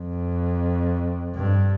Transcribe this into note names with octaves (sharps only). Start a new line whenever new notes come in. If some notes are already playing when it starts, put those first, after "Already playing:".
Already playing: F2
G2